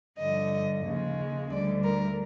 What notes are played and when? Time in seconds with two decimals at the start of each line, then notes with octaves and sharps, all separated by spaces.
0.19 G2 D3 F3 D#5
0.85 D#2 C#3 F3 G#3
1.51 D2 D3 G3 D5
1.84 A#4